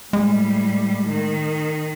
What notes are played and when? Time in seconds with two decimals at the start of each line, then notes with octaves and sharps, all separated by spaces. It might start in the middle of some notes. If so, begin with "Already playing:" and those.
0.13 A2 G3 G#3
1.10 D#3